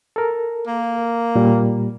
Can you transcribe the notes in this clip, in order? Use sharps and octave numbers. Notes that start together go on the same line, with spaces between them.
A4 A#4
A#3
A#2 G3